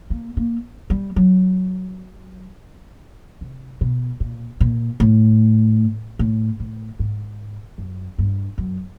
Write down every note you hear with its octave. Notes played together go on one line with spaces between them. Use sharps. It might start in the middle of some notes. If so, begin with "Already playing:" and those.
A#3
A#3
G3
F#3
C3
B2
A#2
A#2
A2
A2
A2
G#2
F#2
G2
F#2